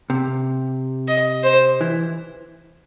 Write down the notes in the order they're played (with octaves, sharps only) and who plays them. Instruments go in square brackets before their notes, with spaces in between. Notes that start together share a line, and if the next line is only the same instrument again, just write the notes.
[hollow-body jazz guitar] C3
[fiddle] D#5
C5
[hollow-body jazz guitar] E3